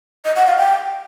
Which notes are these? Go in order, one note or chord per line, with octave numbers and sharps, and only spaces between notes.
D#5
F#5
F5
G5